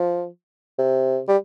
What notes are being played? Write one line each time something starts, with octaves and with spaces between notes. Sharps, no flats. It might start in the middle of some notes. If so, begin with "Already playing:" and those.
Already playing: F3
C3
G3